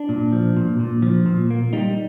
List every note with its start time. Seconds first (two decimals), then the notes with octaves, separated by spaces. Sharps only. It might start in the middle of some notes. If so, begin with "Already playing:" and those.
Already playing: D4
0.09 A#2
0.32 F3
0.57 A#2
0.79 A#2
1.02 F3
1.26 A#2
1.50 A#3
1.73 G3 D#4